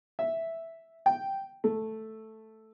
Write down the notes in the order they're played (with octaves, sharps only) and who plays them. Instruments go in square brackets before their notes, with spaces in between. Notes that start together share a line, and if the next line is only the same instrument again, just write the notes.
[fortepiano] E5
G5
A3